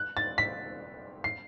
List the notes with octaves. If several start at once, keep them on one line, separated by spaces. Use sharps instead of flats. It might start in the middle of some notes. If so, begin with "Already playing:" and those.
Already playing: F#6
A6
B6
C7